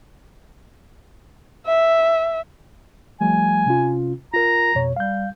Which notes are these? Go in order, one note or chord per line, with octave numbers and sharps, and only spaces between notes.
E5
F3 G3 A3 G#5
C3 C#4 F4
F4 A#4 A#5
F2 B2 C#5
G3 F5 G6